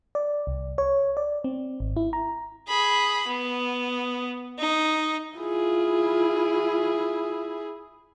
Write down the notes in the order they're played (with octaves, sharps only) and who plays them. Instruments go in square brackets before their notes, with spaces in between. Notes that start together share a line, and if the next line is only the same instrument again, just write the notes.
[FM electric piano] D5
C2
C#5
D5
C4
G#1
E4
A#5
[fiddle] G#4 B5
B3
D#4
[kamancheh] E4 G#4 [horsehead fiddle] F4